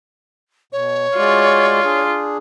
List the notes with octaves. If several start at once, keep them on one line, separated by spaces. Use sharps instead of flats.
B2 C#5
G#3 F4 F#4 D5
D4 G#4